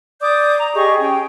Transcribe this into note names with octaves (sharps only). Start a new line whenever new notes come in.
D5 D6 D#6 G6
A#5
G4 G#4 D#5 C#6
C#4 G5